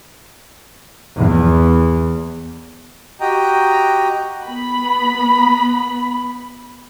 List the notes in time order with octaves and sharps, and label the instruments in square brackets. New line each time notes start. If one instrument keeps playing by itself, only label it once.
[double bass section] E2
[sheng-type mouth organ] F#4 G4 D#5 G5 A#5
[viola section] B3 B5